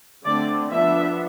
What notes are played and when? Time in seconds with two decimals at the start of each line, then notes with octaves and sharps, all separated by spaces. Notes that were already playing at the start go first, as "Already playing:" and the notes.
0.25 D3 A3 C4 D5
0.72 F3 B3 D4 E5